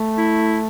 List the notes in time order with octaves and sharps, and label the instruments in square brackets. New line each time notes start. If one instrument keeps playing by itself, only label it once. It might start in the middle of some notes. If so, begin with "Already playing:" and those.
Already playing: [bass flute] A3
[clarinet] E4